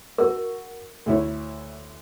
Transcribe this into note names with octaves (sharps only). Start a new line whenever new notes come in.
F#4 A#4
D2 E4 C#5